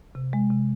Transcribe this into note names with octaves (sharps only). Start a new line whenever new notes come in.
C3
G#3
C3